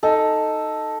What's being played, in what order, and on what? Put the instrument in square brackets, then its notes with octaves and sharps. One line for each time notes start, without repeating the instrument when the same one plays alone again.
[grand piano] D#4 [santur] A4